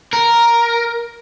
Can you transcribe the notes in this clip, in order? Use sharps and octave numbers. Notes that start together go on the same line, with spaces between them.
A#4